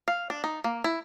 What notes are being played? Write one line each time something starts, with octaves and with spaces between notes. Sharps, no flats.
F5
D4
D#4
A#3
E4